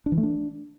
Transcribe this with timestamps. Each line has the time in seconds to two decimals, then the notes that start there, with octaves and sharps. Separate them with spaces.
0.06 D4
0.12 E3
0.18 A3
0.23 D4